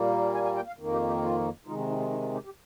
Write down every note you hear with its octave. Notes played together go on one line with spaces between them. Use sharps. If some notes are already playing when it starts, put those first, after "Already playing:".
Already playing: A#2 G3 A#3
G#5
G#5
G5
F5
F2 D#3 A#3
G4
G4
F4
C3 D#3 G#3 D#4 F4
D#4
D#4
F4
D#4
F4
G4
G4